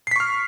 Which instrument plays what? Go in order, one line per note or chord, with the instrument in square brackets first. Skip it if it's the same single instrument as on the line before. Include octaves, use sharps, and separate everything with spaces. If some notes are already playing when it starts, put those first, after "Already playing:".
[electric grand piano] C7
B6
C#6
F6